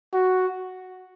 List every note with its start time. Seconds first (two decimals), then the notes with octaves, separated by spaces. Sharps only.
0.14 F#4